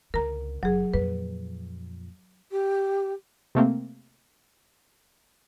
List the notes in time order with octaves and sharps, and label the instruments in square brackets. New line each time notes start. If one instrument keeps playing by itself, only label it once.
[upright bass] C#2 D3 [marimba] A#4 A#5
[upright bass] F#1 [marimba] F#3 G#4
[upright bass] F2 A#2 [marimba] B4
[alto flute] G4
[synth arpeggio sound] C3 A3 A#3 C4